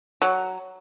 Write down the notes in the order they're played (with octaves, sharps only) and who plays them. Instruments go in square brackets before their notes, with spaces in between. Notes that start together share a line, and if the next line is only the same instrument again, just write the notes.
[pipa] F#3